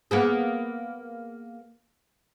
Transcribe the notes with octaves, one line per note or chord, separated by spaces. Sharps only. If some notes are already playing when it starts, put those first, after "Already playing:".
A#3 B3 G#4